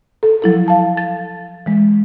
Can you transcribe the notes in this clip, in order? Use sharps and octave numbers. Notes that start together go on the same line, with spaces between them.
A4
F3 F#3 E4 A4
F5 A5
A6
E3 G#3